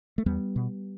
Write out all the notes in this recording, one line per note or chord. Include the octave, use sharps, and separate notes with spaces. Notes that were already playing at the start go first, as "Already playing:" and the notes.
A3
E2 G3 B3
B2